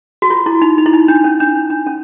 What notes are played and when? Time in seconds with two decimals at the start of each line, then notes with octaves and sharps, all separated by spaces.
0.22 F#4
0.30 F4
0.46 E4
0.62 D#4
0.78 D#4
0.86 E4
0.93 D#4
1.08 D4
1.24 C#4
1.40 D4
1.55 D#4
1.70 D4
1.87 C#4